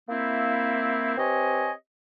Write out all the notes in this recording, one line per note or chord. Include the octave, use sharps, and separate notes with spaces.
A#3 C4 E4
C4 G4 B4 C#5 D#5 G#5